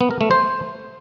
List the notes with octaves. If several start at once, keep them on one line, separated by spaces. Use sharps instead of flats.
B3
A#4
A3
C5